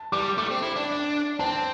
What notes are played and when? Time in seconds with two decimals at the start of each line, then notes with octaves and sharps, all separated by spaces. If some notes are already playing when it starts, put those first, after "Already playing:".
Already playing: A5
0.12 G3 D6
0.38 A3 D6
0.51 C4
0.63 E4
0.76 D4
1.39 C4 A5